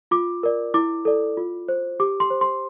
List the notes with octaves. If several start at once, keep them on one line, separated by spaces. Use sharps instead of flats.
F4 D6
A#4 D5
E4 D6
A4 D5
F4
C5
G4 D6
C6
C5
C6